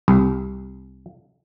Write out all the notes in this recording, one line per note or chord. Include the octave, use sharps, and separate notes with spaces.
C2